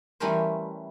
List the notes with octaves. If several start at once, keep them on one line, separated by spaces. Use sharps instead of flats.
E3 G3 A3 C#4 A#4 C5